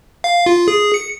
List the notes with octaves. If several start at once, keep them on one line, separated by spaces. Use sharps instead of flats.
F5
F4
G#4
C#7